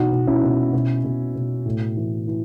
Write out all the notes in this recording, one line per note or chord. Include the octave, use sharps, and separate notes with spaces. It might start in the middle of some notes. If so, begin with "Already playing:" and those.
Already playing: B2 E3 D#4 F#4
B2
C#4 E4
B2
B2
B2
B2
A2
E3
E3